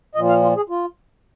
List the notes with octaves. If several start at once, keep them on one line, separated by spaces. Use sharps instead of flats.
A#2 F3 D#5
F5
F4
G#4
F4